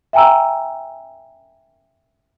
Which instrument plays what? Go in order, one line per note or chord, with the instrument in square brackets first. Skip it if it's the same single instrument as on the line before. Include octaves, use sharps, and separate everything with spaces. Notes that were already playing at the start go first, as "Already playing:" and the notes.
[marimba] E5 G5 G#5 A#5 E6